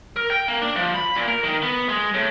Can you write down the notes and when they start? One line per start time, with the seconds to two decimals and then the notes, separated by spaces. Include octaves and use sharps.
0.16 A#4
0.30 G5
0.48 A#3
0.62 D4
0.76 F3
0.94 B5
1.16 A#2
1.28 A#4
1.44 D#3
1.62 B3
1.89 G#3
2.14 A2